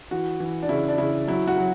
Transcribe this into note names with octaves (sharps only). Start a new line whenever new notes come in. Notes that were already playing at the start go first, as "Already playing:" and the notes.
E3 F#4
E3
D4
C#3 E4
D4
C#3 E4
F#3 E4
F#4
F#3